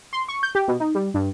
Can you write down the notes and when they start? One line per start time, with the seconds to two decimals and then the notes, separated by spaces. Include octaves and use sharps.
0.13 C6
0.28 C#6
0.43 G6
0.55 G4
0.68 B2
0.80 D#4
0.95 G3
1.14 G2